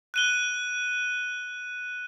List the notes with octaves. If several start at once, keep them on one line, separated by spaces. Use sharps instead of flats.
F#6 D#7 G7